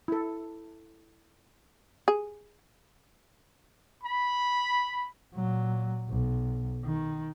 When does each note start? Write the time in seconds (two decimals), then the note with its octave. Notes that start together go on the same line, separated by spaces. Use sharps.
0.08 E4 A4
2.08 G#4
4.03 B5
5.35 A#2 F#3
6.09 B1
6.84 D#3